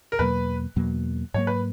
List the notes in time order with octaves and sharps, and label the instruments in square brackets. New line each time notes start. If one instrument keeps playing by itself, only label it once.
[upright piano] A#4
[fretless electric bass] E2 B2 F#3 A#3 [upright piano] B4
[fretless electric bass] E2 B2 F#3 A#3
[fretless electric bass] G#2 F#3 A#3 [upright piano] C#5
[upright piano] B4